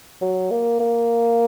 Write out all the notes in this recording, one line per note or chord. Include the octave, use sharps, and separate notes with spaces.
F#3
A#3
A#3